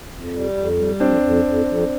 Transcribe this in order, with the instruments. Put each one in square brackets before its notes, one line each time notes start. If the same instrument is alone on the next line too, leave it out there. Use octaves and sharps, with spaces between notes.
[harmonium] F2
G3
F2
G3
[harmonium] F2 [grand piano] C4 D4
[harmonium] F2
F2
F2